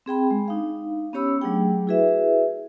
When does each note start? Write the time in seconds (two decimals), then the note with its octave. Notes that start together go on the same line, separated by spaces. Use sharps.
0.06 C4 G#4 G5 B5
0.31 G#3
0.48 D4 D#4 F5
1.13 B3 C#4 G4 C#5 B5 E6
1.42 F#3 A3 D4 G#4 G5
1.87 E4 F#4 G#4 B4 E5